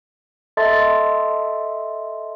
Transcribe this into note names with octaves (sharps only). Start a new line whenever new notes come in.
A4 D#5 E5 A5 C6 A6